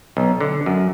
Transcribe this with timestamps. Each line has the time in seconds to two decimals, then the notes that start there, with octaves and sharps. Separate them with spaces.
0.17 B1
0.41 D3
0.66 F#2